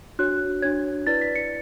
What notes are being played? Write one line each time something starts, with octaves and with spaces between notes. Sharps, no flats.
D4 F#4 C#5 F#6
D4 F#4 C#5 G#6
E4 B4 D5 A6
B6
C#7